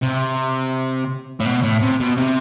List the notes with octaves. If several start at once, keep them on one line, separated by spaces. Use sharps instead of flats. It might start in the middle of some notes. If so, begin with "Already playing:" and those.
C3
A2
B2
A2
C3
B2
C3